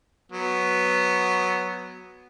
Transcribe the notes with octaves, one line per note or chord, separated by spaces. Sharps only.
F#3 B3